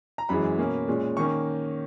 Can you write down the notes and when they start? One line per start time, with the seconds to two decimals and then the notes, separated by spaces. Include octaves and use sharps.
0.18 A#5
0.29 F#2 E3 G#3 B5
0.58 B2 A#3 C#4
0.88 A#2 G#3 C#4
1.17 D#3 A#3 C#4 C#6